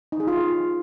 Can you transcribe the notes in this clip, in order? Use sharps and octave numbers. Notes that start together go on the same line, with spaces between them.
D#4
G#4
F4